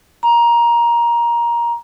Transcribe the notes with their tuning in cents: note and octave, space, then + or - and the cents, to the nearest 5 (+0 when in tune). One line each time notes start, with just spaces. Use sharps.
A#5 +15